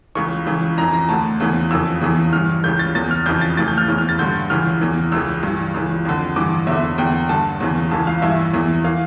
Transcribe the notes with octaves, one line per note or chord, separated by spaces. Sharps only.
C#2 C#3 E3 C#6
C#2 C#3 E3
F2 E3 A#5
A#5
D2 D3 A5
E2 C#3 E3
F2 C#3 E3 E6
E2 C#3 E3
G2 E3 F6
C#2 C#3 E3 G6
A6
E2 E3 A6
F6
F2 C#3 E3 G6
A6
D2 C#3 E3 A6
G6
F6
E2 C#3 E3
F6
A6
G2 D3 G6
C#2 C#3 E3 F6
E2 E3
C#2 C#3 E3 E6
G2 E3
C#2 C#3 E3
F2 D3
G2 E3 D6
E2 D3 E5
E2 D3 G5
G2 D3 A5
E2 C#3 E3
C#2 C#3 E3 A5
F5
G2 E3 E5
E2 E3
E3 F5